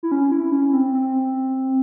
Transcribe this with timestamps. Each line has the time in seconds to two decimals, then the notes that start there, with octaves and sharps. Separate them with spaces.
0.03 E4
0.12 C#4
0.32 E4
0.52 C#4
0.73 C4
0.94 C4